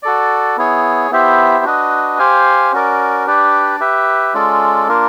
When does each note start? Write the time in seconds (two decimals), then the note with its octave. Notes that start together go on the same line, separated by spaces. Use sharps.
0.03 F#4 A4 D5
0.57 B3 E4 G#4 C#5
1.11 B3 E4 G4 C5 E5
1.65 D4 F#4 B4 D#5
2.19 G4 C5 F5 G#5
2.72 C#4 F#4 A#4 D5
3.27 D4 G4 B4 D5
3.80 G4 B4 E5
4.34 G#3 C#4 F4 A4 D5
4.88 A#3 D4 F4 A#4